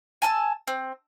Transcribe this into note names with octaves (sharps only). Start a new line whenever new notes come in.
G#5 A5 E6
C4